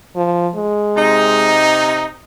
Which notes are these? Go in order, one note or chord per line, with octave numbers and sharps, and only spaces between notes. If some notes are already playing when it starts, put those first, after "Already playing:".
F3
G#3
C3 D#4